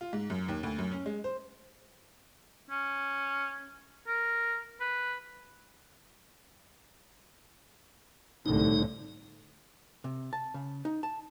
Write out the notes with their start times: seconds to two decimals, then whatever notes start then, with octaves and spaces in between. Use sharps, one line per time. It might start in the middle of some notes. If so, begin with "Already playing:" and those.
0.01 F4
0.13 G#2
0.30 F#2
0.48 D#2
0.63 D2
0.79 F#2
0.92 C#4
1.06 G#3
1.24 C5
2.70 C#4
4.07 A#4
4.80 B4
8.46 C2 A2 D3 D#4
10.04 C3
10.33 A5
10.54 C#3
10.85 D#4
11.03 A5